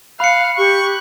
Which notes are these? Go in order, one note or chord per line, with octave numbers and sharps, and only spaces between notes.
F5 B5 F#6 C#7
G4 C#6 F#6